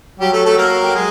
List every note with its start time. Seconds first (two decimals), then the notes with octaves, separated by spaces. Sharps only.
0.20 F#3 G3 G4
0.33 A3 A4
0.46 A3 A4
0.58 A#3 A#4
0.83 G4
0.95 G#3 G#4